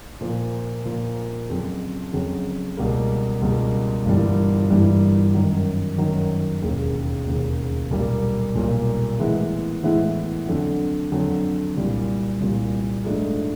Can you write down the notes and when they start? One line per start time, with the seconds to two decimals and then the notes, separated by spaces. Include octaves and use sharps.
0.21 A#2 F3 A#3
0.85 A#2 F3 A#3
1.49 F2 C#3 F#3
2.13 F2 C#3 F#3
2.77 C#2 B2 G3 A#3
3.41 C#2 B2 G3 A#3
4.05 G1 G2 E3 G3 A#3
4.70 G1 G2 E3 G3 A#3
5.34 F#2 D#3 F#3
5.98 F#2 D#3 F#3
6.62 E1 D#2 C#3
7.27 E1 D#2 C#3
7.91 B1 A#2 G3 A#3
8.55 B1 A#2 G3 A#3
9.19 A2 E3 G#3 B3 E4
9.83 A2 E3 G#3 B3 E4
10.47 F2 D3 F#3
11.12 F2 D3 F#3
11.76 C2 A#2 G3
12.40 C2 A#2 G3
13.04 G#2 F3 A3 D4